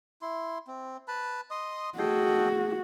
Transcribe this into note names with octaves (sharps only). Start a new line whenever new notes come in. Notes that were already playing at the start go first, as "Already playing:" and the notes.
E4 C6
C4
B4 A5 B5
D#5 C6 D#6
A3 F#4 G#4 A4 D#5 G5